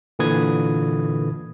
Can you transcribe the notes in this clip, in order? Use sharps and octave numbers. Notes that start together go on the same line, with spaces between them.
A#2 D3 E3 B4 D#6 G#6